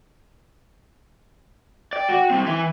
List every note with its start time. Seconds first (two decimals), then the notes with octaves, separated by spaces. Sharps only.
1.93 D5 G5
2.09 F#4
2.31 G3 C4
2.46 E3 E4